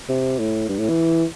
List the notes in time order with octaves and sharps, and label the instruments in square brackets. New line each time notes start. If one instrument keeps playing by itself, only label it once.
[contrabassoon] C3
A2
G2
A2
E3